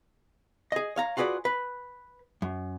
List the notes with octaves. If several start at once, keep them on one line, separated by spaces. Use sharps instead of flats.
G#4 D#5
C#5 F5 A#5
F4 F#4 G#4 B4 D5
B4
F#2